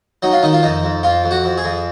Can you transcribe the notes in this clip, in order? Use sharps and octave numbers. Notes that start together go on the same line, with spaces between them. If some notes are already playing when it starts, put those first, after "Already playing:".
F#3 D#4
F4
D#3 D#4
F4
F2 D#4
F2
F2 F4
F2
F#4
F2
G#4
F2